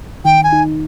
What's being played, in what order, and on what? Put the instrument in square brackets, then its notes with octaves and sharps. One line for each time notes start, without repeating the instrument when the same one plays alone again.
[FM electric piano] D#3 [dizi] G5
[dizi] G#5
[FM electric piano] D#4